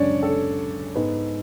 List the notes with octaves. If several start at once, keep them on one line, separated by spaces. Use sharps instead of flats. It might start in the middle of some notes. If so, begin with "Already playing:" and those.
Already playing: F#2 C#3 G#3 C#4 D4 C#5 D5
A4
G#2 G#3 B3